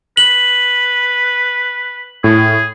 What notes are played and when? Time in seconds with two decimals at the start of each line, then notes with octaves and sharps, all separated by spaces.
0.17 B4 F#7
2.24 A2 G#4